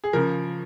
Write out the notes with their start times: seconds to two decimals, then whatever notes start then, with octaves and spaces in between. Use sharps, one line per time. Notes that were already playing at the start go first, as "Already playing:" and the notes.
0.04 G#4
0.13 C#3 F3 A#4